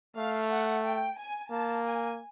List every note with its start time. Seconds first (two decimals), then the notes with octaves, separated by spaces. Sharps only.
0.17 A3 F5
0.50 F#5
0.85 G5
1.18 G#5
1.51 A#3 A5
1.85 G#5